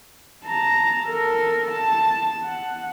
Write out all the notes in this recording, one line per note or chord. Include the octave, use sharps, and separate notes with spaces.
A5 A#5
A4 A#4
A5
F#5